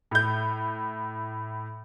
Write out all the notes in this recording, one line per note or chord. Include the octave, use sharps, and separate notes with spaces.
A2 G6